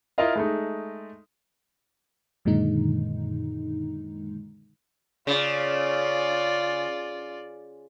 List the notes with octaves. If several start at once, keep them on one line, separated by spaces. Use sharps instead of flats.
E4 F4 A#4 D#5 F5
G#3 A3 D#4
F#2 A#2 D3 D#3 G#3 D#4
C#3 F4 D5